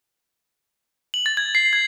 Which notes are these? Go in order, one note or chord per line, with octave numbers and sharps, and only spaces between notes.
F#7
A6
G#6
C7
G#6